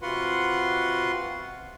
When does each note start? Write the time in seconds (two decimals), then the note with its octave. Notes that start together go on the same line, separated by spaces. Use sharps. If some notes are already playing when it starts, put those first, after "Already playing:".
0.02 C3 F4 F#4 B4 F#5 C6